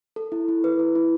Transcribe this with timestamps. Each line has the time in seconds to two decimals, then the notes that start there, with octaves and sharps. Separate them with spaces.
0.16 A4
0.32 E4
0.49 E4
0.64 B4
0.79 E4
0.95 E4